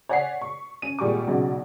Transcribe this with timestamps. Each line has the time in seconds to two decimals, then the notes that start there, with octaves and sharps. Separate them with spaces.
0.09 C#5 D5 F#5 G#5 B6 C7
0.41 C#6
0.82 C#4 D#7
0.99 G#1 A#2 G3 G#4 C#6 D6
1.27 B1 C#3 F#4 D5